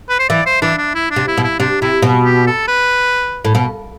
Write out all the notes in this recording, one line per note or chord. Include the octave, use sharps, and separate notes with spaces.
B4
C5
E3 D5
C5
E3 D4
D4
E4
D4
C3
E4
B2
E4
C3 D4
C3 E4
B2
G4
A4
B4
A2
B2